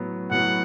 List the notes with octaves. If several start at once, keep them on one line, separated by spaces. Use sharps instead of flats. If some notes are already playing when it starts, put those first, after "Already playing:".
Already playing: A2 F#3 B3
A2 F#3 B3 F#5